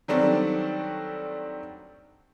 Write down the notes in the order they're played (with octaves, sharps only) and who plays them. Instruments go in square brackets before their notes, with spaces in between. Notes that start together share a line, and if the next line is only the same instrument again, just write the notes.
[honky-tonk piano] D#3 F#3 G3 A3 C4 D4